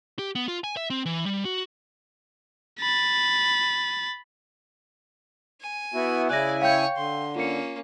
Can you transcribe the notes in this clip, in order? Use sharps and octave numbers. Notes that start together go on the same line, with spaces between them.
G4
B3
F4
G#5
E5
C4
E3
G3
F#4
B5 A6
G#5
B3 E4 F#4
C#3 E4 D5 G#5 F#6 A#6
C#5 F5 G5 C#6 G6
D3 C6
A#3 C#4 F4 C#7